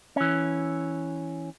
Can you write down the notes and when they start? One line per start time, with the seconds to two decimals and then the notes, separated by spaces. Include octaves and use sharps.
0.16 E3 C#4